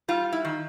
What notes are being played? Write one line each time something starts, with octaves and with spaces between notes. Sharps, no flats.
G3 F4
E4
D#3